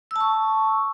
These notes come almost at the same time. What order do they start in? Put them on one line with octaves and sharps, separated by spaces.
E6 A5 C#6